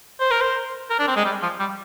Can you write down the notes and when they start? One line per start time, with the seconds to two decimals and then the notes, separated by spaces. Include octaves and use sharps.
0.21 C5
0.31 A#4
0.41 C5
0.90 A#4
0.99 D4
1.08 C4
1.16 G#3
1.25 G3
1.43 F3
1.60 G3